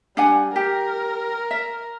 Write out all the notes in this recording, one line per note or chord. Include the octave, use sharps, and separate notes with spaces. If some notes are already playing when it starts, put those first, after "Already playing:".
G3 D4 F#5 G#5
G4 A#4
E5